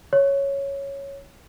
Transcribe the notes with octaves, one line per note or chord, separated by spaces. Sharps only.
C#5